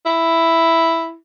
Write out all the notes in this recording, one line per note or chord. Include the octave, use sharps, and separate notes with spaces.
E4